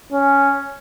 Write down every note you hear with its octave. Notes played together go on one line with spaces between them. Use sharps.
C#4